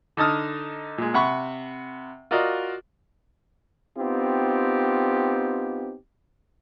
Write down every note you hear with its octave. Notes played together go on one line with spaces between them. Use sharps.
D3 D#4 A5 D#6 F6
A#2 G#3
C3 F#5 B5 C#6
F4 F#4 A#4 D5 D#5 F5
B3 C4 D#4 F4 G4